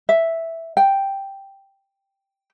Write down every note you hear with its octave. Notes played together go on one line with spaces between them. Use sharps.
E5
G5